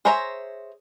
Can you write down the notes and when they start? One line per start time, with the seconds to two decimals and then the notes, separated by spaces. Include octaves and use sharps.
0.05 G#4 C5 C#5 E5 A#5